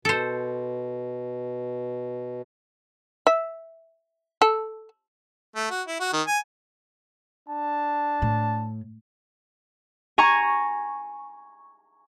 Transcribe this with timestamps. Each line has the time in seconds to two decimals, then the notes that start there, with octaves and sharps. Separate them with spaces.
0.05 B2 A4 C5
3.27 E5
4.42 A4
5.56 A3
5.71 F#4
5.87 E4
6.00 F#4
6.13 D#3
6.27 G#5
7.47 D4 A5
8.22 A2
10.18 G#5 A#5 C#6